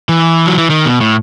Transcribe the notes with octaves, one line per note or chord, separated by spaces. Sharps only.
E3
F#3
E3
D#3
B2
A2